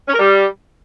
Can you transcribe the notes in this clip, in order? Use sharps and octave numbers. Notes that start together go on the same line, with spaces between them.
C#4
A#4
G3